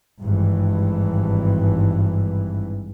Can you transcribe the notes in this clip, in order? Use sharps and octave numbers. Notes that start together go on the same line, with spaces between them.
G#1 G2 E3